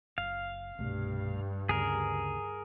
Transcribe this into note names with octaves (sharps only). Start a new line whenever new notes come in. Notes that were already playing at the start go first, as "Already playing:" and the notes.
F#1 F5
C2 G2 B2 A3
D2 C#3 G#4 A#4